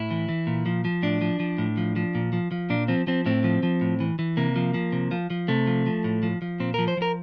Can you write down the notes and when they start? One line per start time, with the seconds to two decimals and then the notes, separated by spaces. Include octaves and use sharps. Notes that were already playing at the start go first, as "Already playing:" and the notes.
Already playing: A2 E4
0.11 E3
0.29 E3
0.47 A#2
0.66 F3
0.85 F3
1.03 A2 D4
1.21 F3
1.40 F3
1.58 A2
1.77 F3
1.96 F3
2.15 A#2
2.33 F3
2.52 F3
2.70 A#2 D4
2.88 F3 C4
3.07 F3 C4
3.26 A2 C4
3.44 F3
3.63 F3
3.81 A2
4.00 E3
4.19 E3
4.37 C3 A#3
4.56 F3
4.74 F3
4.92 C3
5.11 F3
5.30 F3
5.48 C3 A3
5.67 F3
5.86 F3
6.04 A2
6.23 F3
6.42 F3
6.60 A#2 C4
6.74 F3 A#4
6.88 C5
6.97 F3 A#4